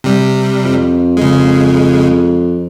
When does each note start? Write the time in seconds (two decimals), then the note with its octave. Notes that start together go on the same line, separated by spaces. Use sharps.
0.04 C3 G3
0.64 F2
1.17 C#3 G#3